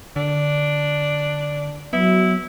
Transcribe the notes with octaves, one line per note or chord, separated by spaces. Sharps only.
D3 D4
F#3 B3 E4